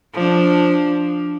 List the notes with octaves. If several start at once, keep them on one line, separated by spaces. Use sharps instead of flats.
F3 D4